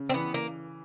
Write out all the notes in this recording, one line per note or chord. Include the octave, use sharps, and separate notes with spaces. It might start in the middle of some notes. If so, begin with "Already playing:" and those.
Already playing: C#3
C4
E3 B3
A#3